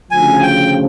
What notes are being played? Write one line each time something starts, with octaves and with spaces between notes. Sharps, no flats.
D2 C#3 F3 G#5
G5